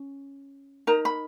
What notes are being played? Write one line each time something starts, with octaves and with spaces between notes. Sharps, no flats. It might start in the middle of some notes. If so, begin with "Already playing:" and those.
Already playing: C#4
D#4 A#4 A#5
B5